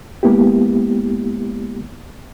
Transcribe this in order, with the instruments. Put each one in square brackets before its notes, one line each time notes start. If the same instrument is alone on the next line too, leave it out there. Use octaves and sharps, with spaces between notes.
[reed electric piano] G#3 A#3 B3 E4 G4